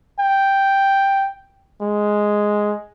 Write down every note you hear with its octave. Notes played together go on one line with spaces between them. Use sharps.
G5
G#3